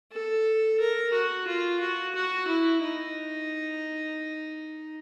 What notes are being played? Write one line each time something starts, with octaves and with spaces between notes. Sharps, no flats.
A4
A#4
F#4
F4
F#4
F#4
E4
D#4